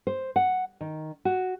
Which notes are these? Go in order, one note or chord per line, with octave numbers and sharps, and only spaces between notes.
C5
F#5
D#3
F#4